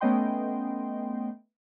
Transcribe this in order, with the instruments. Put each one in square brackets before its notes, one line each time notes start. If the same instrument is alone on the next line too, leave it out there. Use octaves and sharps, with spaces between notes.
[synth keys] A3 B3 C#4 D#5 G5 C6